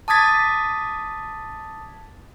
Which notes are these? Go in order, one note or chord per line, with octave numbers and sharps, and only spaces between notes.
A5 D6 D#6 G#6 A6 B6